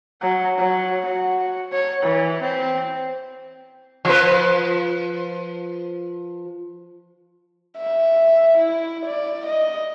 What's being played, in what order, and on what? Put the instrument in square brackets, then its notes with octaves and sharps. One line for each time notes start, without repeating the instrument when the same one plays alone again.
[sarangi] F#3
F#3
F#4
C#5
E3
C4
[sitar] F3 B4
[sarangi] E5
E4
D5
D#5